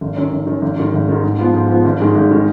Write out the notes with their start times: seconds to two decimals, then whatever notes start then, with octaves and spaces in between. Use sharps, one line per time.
0.01 G#1
0.16 F#2 D#3
0.32 G#1
0.47 F#2 D#3
0.62 G#1
0.78 G#2 D#3
0.93 G#1
1.08 G#2 D#3
1.24 G#2
1.39 F3 B3 F4
1.54 G#2
1.69 F3 B3 F4
1.85 G#1
2.00 G#2 D#3 G#3
2.15 G#1
2.31 D#3 G#3